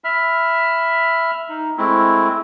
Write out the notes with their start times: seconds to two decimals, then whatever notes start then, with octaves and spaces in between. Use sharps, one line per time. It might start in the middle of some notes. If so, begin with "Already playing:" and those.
0.04 E5 B5 F6
1.49 D#4
1.78 G#3 A3 C4 E4